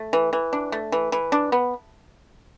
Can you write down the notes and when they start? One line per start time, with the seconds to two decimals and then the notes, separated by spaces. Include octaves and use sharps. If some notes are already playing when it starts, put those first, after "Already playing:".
Already playing: A3
0.13 E3
0.33 E3
0.53 D4
0.72 A3
0.92 E3
1.12 E3
1.32 D4
1.52 B3